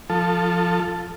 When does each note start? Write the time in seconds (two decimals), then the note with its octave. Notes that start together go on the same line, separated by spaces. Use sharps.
0.10 F3 A4